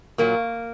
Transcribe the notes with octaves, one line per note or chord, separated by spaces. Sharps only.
A#2 F#3 A#3